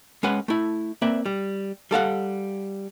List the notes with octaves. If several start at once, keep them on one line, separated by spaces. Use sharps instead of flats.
G#3 C#4 B4 F#5
A3 E4
A#3 C4 B4 D5 E5
G3
G3 A4 F5 F#5